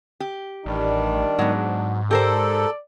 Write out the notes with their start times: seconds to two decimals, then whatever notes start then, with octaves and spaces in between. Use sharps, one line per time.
0.20 G4
0.66 A1 D#3 G3 D4
1.39 G#2 F#3 B3
2.11 G4 A4 A#4 C5 D5